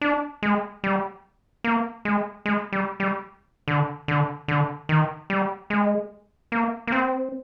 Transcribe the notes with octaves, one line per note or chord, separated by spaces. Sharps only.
D4
G#3
G3
A#3
G#3
G#3
G3
G3
D3
D3
D3
D#3
G3
G#3
A#3
A#3
C4